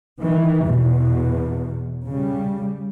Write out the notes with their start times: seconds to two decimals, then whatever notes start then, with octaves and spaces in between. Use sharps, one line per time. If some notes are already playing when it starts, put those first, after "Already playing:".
0.21 D#3 E3
0.68 E2 B2
2.07 C#3 G3